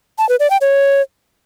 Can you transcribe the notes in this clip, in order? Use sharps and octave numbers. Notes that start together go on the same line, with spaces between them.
A5
B4
D5
G5
C#5